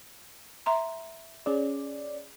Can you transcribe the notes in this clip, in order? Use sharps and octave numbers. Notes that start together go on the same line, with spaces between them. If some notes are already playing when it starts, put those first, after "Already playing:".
E5 A#5 C6
C#4 G#4 D5